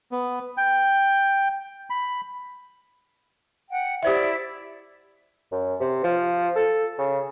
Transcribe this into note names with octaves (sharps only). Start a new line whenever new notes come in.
B3
G5
B5
F#5 G5
E4 G4 C5 D5 E5
F#2
C3
F3
A4
C#3